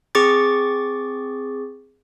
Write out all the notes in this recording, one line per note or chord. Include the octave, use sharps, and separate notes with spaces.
C4 G#4 C#6 D6 A6